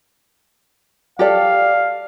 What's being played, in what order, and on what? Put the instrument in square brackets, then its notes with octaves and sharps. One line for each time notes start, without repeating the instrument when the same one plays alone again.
[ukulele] G4 A4 D5 [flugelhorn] F5